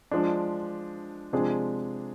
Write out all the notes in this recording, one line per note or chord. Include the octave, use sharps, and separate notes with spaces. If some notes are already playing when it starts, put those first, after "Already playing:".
F3 G#3 D4
C3 F3 G#3 D4 G#4